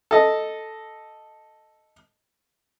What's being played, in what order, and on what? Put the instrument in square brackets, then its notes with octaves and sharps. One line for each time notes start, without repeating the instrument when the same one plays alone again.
[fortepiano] A4 D#5